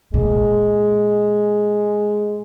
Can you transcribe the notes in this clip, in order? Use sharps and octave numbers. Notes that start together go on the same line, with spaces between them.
A#2 G#3